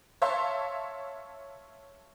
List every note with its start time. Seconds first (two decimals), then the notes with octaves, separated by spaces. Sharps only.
0.22 C#5 E5 F5 A5 C6 C#6